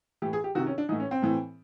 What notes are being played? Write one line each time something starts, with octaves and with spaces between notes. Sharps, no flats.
A2 E3 G4
G#4
G4
C3 D#3 F#4
C#4
D4
A2 E3 D#4
C#4
C4
A2 E3